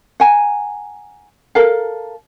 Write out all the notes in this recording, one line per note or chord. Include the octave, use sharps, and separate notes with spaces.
F#5 G#5 A#5
A4 A#4 F5